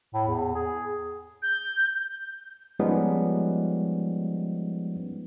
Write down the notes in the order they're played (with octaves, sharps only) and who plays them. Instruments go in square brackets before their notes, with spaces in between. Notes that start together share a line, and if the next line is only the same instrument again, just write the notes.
[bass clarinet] A2
E2
G#4
[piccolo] G6
[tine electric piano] F3 G3 G#3 B3 C#4 D#4